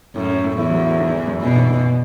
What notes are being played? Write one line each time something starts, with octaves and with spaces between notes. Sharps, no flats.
F#2 A2
C#4
A2
E2 E4
F#3
E4
G#1
E3
F#2
B2 E3
G#1
G#1